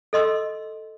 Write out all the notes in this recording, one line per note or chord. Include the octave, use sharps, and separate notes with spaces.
A4 D#5 C6 E6